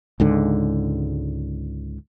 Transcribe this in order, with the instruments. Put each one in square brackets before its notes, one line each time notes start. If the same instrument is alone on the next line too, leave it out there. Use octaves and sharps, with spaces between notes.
[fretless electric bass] C#2 G#2 D3